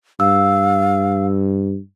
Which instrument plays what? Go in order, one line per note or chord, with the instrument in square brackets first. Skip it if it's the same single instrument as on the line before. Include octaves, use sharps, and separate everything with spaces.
[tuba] G2 [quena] F5 [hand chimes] E6